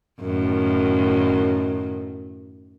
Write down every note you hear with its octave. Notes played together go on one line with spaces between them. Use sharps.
F#2 A2 D#3